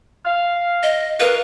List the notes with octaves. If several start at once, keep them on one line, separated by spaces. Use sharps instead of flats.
F5
D#5
F2 A#4 B4 F5